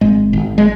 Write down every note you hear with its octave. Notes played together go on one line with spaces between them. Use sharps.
G#1 G#3
G#1
G#3